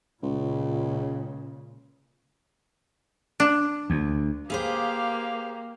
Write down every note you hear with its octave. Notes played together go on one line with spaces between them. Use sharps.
C#2 A#2 C#3
D4
D2
A#3 G4 G#4 B4 C5 F5